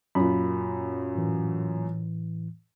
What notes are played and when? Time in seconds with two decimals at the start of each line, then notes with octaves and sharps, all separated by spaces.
0.15 F#2 A#2 B5
1.15 A2 E3